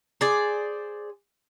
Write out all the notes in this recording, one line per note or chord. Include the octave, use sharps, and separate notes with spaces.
G#4 C5 D5